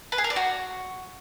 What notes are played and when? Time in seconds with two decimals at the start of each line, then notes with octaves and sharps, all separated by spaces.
0.12 B4
0.18 G#4
0.24 A#4
0.30 D5
0.36 F#4